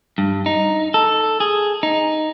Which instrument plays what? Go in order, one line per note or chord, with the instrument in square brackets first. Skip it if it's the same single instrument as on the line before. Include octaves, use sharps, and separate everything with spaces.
[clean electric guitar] G2
D#4
A4
G#4
D#4